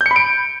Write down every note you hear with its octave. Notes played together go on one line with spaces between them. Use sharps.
G6
C#7
B5
D7